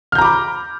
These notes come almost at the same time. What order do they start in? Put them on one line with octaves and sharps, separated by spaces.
F6 G6 A#5 D6 B5